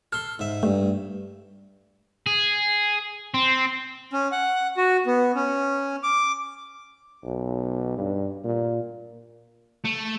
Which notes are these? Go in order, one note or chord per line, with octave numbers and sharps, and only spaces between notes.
A4 C6 F6
G#2 E5
G2 A3
G#4
C4
C#4
F#5
F#4
B3
C#4
D6
B1
G2
A#2
A3